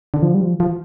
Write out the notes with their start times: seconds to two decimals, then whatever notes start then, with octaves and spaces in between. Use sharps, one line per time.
0.14 D3
0.22 F3
0.34 G3
0.41 F3
0.60 F3